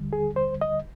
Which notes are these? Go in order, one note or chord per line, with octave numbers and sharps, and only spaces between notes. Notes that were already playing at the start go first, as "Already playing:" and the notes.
Already playing: D#2 D3 G3
G#4
C5
D#5